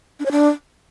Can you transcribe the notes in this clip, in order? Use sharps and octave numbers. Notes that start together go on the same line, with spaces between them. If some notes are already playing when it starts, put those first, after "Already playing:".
D4
C#5
D4